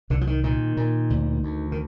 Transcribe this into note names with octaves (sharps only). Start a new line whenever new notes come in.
C2 D3
F3
D#3
A#2 D#3
A#2
D2
D2
D#3